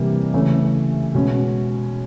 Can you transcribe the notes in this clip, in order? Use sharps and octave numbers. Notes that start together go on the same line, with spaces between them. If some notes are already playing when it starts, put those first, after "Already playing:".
Already playing: C3 E3 G3 A#3
C#3 E3 A3 C#4
B2 G#3 C#4